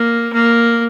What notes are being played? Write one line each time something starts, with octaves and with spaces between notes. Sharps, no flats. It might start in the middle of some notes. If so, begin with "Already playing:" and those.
Already playing: A#3
A#3